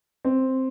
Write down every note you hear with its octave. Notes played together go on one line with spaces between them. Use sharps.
C4